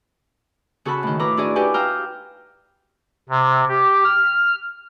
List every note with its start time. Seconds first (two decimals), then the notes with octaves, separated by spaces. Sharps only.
0.85 C#3 F#4 A4 F#5 B5 F#6
1.03 A2 D#3
1.19 A2 E4 F4 B4 A#5 D6
1.37 D4 E4 F#4 G#4 D5 D#5
1.56 D#4 E4 G4 B4 F#5 G#5
1.74 F5 G5 A#5 E6 F6
3.29 C3
3.69 G4
4.04 F6